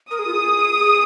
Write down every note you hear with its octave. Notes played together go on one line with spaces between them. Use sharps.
A#4 D#6
G#4
F4
G#4
G#4